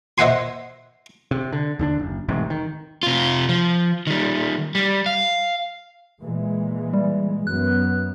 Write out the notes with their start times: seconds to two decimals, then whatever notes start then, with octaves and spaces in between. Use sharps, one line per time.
0.18 C5 D#5 E5 F#5 G#5 C6
1.31 C3
1.53 D3
1.79 D#2 D3 D4
1.99 F#1
2.28 E1 A1 G#2 C3
2.50 D#3
3.03 C3 F4
3.49 F3
4.07 D#3 G3
4.75 G3
5.06 F5
6.21 A#2 E3 G#3
6.94 G3
7.47 F#2 B3 F#6